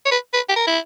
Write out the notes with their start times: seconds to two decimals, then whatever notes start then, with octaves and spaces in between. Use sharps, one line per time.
0.06 C#5
0.11 B4
0.34 B4
0.49 G4
0.56 A#4
0.67 E4